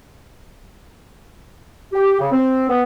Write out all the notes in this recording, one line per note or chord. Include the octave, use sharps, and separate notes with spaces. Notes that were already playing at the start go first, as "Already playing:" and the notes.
G4
C#3
C4
B3